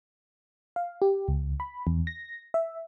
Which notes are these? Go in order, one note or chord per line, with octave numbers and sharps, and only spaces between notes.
F5
G4
C#2
B5
E2
A#6
E5